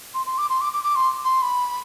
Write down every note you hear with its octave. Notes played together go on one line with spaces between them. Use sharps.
C6
C6
D6
C6
D6
D6
D6
C6
C6
B5